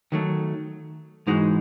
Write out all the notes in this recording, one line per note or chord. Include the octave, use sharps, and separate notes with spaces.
D#3 F#3 A3
G#2 E3 G#3 D#4 F#4